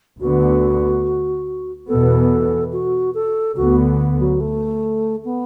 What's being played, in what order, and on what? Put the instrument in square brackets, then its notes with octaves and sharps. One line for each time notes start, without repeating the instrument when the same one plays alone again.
[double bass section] D2 D3 B3 [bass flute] F#4
[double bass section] E2 B2 B3 [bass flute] A4
[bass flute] F#4
A4
[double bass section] D2 D3 B3 [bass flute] F#4
[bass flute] F#3
A3
B3